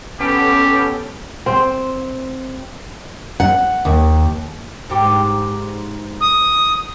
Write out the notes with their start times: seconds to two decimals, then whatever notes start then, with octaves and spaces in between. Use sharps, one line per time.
0.20 B3 C#4 G4 A4
1.46 C4
3.40 F#5
3.85 D#2
4.90 G#2 G4
6.21 D#6